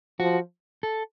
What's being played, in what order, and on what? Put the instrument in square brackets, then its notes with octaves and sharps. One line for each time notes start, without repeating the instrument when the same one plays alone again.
[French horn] F3 [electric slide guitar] F#4
[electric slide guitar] A4